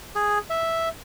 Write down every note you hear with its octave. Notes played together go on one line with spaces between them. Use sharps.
G#4
E5